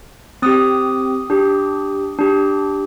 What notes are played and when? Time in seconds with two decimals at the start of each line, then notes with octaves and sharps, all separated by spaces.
0.42 C4 G4 D#6
1.30 D4 G4
2.18 D4 G4